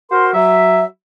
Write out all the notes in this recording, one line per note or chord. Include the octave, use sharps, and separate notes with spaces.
F#4 A#4 C5 C6
F#3 E5